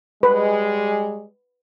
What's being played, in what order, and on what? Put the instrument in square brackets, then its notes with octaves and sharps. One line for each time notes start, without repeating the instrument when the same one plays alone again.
[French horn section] G3 G#3 [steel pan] B4